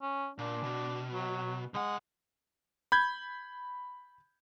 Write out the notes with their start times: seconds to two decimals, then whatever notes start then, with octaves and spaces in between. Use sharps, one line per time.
0.02 C#4
0.38 A#2 D4
0.64 B2
1.13 F#3
1.74 B1 G#3 F#5
2.92 B5 G6 G#6